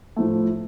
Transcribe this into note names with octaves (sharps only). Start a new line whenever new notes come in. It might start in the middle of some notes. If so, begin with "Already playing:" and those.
A2 F3 A3